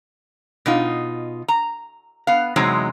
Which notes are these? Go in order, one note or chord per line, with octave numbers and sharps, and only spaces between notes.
B2 D#4 F4
A#5
B3 F5
E2 C3 F#3 G#3 C4 D#4